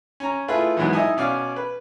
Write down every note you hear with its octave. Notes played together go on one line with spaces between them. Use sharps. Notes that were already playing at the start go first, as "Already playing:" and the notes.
C#4 A#5
A3 E4 F4 G#4 B4
E2 G#2 E3 F#3 G#3 B3
D#4 E4 D#5 E5 G#5
B2 C#4 D5 F5
B4